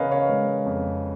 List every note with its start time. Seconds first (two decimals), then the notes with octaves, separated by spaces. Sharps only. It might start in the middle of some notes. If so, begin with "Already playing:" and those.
Already playing: C#3 B3 G#4 A#4 B4 C#5 D#5 F5
0.12 C#5 F5
0.29 G#3
0.66 F2